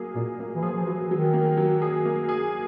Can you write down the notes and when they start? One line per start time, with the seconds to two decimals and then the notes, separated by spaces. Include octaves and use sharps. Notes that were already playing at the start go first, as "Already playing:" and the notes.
Already playing: F#3 A#3 G#4
0.15 A#2 A#3
0.40 A#3
0.56 E3
0.63 F3 G#4
0.76 F3
0.87 E3 F#3
1.11 D#3 F#3
1.33 A#3
1.57 F#3
1.82 G#4
2.05 A#3
2.29 G#4